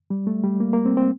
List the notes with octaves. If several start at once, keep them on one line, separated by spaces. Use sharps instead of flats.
G3
A3
G3
A#3
A#3
C4
C4